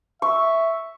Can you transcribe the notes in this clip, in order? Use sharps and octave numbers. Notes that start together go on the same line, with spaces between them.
E5 C#6